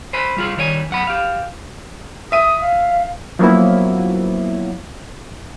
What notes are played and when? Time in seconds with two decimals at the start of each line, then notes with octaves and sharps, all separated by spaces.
0.13 C5 G#5 B5
0.37 G3 F4 G#4
0.57 D#3 G3 C#5 E5 G#5
0.90 F#2 F#5 B5
1.07 G4 F5
2.32 E5 D#6 D#7
2.61 F5
3.39 F3 F#3 A#3 B3 C#4 E4